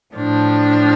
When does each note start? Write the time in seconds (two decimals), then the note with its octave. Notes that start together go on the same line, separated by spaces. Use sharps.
0.15 A2 F3 D4